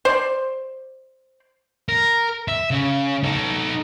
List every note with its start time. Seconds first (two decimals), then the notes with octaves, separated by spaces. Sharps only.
0.05 C5 D5
1.88 A#4
2.48 E5
2.71 C#3
3.24 D#4 A4